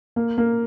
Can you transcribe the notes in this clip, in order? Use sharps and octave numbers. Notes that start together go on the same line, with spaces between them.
A#3
A#3